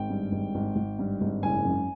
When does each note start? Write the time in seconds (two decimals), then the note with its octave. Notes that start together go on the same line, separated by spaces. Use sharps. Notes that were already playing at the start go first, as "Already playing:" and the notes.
Already playing: G#1 G5
0.10 G2
0.32 G#1
0.55 G#1
0.76 G#1
0.99 G2
1.21 G#1
1.43 F#1 G#5
1.65 F#2